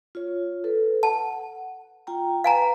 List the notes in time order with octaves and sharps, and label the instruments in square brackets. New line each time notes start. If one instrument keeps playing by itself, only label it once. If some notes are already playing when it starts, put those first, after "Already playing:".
[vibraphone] F4 C#5
A4 B4
[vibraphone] F#5 [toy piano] A5
[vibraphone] F4 G5 A#5
[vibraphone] B4 [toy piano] F5 G#5 A#5